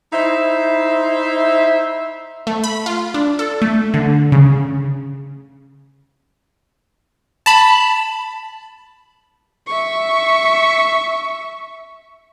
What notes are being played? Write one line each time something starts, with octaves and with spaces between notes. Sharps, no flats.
D#4 E4 C5 E5
A3
B5
F4
D4
A4
A3
D3
C#3
A5 B5
E5 C#6